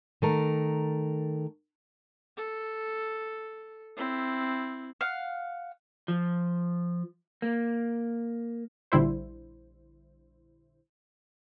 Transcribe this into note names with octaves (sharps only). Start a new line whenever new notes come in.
D#3 A3 A#4
A4
C4 E4
F5 F#5
F3
A#3
A#1 D3 G3 E4 C5